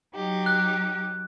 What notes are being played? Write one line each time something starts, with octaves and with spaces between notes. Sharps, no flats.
F#3 D#4 G4
F#6